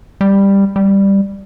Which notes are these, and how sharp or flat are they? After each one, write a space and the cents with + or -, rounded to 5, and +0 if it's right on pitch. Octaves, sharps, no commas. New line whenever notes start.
G3 +10
G3 +5